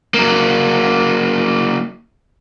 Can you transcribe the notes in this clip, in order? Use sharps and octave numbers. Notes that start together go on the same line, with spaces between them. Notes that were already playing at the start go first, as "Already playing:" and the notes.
F#3 A#3